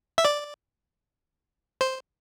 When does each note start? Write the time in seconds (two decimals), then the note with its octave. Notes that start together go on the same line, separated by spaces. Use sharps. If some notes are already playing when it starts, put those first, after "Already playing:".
0.18 E5
0.25 D5
1.81 C5